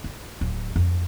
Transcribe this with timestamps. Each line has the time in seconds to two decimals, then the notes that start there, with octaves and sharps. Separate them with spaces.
0.04 D4
0.41 D1
0.76 F2